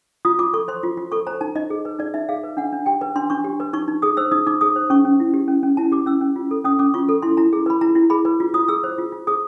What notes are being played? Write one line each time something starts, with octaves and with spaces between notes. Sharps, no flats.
F4 D#6
F4 D6
A4 C#6
C5 C6
F4
F4
A4 C#6
C5 A#5
D#4 A5
D#4 D#5
G#4
B4
D#4 D5
D#4 E5
G#4 F5
B4
D4 F#5
D4
G4 G5
B4
D4 C6
D4 C#6
G4
B4
D#4 C#6
D#4
G#4 D#6
C5 E6
D#4 D#6
D#4 D6
G#4 D#6
C5
C#4 C#6
C#4
E4
G4
C#4
C#4
E4 A5
G4 D6
C#4 E6
C#4
F4
A4
C#4 D#6
C#4 D6
F4 C#6
A4
E4 C6
E4 A#5
G#4
B4 B5
E4 A#5
E4
G#4 B5
B4
F4
F4 D#6
G#4 E6
C5
F4
F4
G#4 D#6